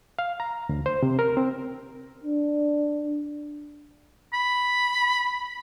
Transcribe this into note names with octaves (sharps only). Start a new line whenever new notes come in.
F5
A#5
D2
C5
C3
A#4
C4
D4
B5